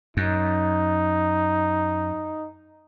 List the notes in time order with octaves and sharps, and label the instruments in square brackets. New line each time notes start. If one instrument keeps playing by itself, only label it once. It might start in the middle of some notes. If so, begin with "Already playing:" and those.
[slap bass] F#2 [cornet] D#4